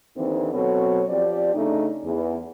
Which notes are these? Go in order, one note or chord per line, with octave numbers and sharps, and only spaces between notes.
D#2 D3 E3 C4 D#4
B2 F#3 C4 A4 C#5
F3 C4 G4 D5
C#3 A3 D4 D#4
E2